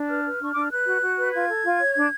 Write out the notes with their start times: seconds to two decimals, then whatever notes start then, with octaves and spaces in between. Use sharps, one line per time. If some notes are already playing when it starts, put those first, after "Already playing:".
Already playing: D4
0.09 B4 F6
0.24 B4
0.40 D4 C#6
0.52 D4 D6
0.61 F6
0.71 B4 F#6
0.86 F#4
1.02 F#4
1.18 B4
1.33 F4 G#6
1.48 A4
1.64 F4
1.80 C#5
1.95 D4